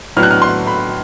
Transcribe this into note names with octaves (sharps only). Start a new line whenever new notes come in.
A2 F#3 B3 D4 F6
F#6
F6
C6
B5